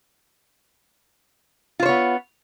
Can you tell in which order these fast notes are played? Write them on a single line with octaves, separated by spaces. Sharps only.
F4 C5 C#5 B3